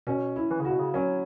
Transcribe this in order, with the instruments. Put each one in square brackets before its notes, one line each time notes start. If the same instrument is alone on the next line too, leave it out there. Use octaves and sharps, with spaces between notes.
[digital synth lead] B2 [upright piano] C#4
[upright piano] E4
[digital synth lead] E3
C#3
[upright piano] F#4
[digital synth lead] B2
C#3
[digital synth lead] F#3 [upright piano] C#4